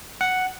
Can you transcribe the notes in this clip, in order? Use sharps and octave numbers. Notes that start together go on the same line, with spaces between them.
F#5